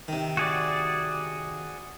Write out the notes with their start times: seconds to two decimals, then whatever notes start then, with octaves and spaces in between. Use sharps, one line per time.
0.08 C3 D#3
0.37 F#4 G#4 D5